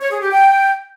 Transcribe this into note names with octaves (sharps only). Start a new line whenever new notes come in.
C#5
G#4
G4
G5